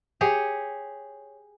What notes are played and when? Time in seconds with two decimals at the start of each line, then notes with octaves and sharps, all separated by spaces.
0.21 G4 G#4 C#5